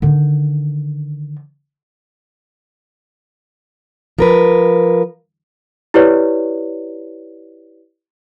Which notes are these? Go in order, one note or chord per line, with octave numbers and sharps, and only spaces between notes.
D3 D#3
F3 A#4 B4
E4 G4 B4 C#5 D5